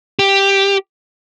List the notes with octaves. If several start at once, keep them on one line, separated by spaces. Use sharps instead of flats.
G4